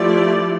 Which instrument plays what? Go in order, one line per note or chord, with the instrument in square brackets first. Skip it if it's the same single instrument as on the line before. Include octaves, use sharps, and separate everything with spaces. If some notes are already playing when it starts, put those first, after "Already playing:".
Already playing: [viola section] F3 A3 E4 G4 D5